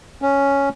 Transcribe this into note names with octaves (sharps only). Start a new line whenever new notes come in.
C#4